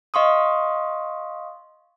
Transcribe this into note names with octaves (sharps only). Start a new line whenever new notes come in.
D#5 F5 C6 C#6 D#6